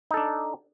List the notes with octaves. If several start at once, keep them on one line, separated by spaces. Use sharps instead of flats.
D4 D#4 A4